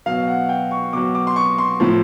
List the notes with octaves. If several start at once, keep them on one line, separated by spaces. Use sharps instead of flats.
B2 F#3 F5
F#5
G5
C#6
B2 F#3 D6
D6
C6
C#6
C6
A2 F3